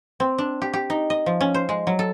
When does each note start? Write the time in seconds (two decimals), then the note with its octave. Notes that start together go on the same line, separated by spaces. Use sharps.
0.20 C4
0.38 D4
0.62 G4
0.73 G4
0.90 D#4
1.10 D#5
1.26 F3
1.41 C#4
1.54 C5
1.69 G#3
1.87 F#3
1.99 A4